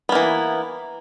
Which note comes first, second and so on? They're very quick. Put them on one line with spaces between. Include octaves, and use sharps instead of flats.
B3 A#3 E3